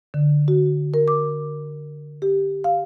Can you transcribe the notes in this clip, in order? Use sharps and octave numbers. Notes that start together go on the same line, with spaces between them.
D3
F#4
A#4
D6
G4
F5